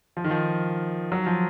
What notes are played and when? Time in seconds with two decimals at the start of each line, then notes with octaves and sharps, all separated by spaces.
0.17 F3
0.24 D#3
0.31 F3
1.12 F#3
1.26 F3